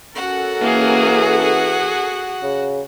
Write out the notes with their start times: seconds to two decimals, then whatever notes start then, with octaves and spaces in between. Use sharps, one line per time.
0.15 C#4 F#4 A4 A#4 F#5
0.61 E3 A#3 G#4
1.42 G#4
2.43 C#3